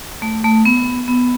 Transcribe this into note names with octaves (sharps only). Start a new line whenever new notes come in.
A3
A3
B3
B3